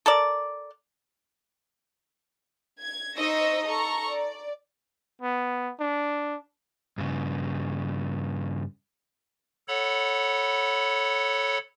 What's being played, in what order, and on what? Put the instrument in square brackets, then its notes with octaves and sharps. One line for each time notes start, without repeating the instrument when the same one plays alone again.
[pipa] A4 A#4 D5
[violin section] G#6
D#4 C5 D#5 C#6 E6 A#6
A4 A#5 C#6
D5
[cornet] B3
D4
[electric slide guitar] G2 C#3
[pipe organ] A4 C#5 F#5 B5